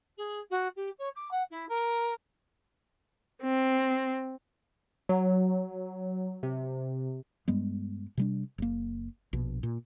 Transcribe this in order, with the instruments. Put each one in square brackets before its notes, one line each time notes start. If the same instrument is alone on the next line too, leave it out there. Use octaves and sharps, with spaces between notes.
[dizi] G#4
F#4
G4
C#5
D6
F#5
E4
A#4
[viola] C4
[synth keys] F#3
C3
[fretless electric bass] G2 G3 G#3 B3
C3 G3 D4
F#1 A#3
A#1 B2
A#2